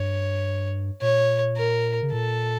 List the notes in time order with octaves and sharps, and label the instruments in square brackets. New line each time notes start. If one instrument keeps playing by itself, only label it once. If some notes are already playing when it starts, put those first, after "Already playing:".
Already playing: [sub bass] G2 [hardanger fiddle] C#5
[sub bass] A#2 [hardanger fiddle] C#5
[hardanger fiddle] A#4
[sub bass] C#3
[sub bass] A#2 [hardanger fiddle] A4